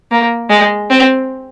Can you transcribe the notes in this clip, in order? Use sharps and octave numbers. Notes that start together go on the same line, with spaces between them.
A#3
G#3
C4